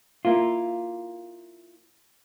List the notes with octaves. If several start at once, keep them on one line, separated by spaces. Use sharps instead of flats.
A#3 E4 F4